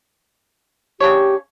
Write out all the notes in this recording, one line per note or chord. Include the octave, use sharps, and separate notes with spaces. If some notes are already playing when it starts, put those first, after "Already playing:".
C#3 D4 G4 C#5